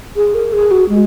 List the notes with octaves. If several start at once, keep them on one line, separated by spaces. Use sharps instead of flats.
G#4
A#4
G#4
F#4
G#3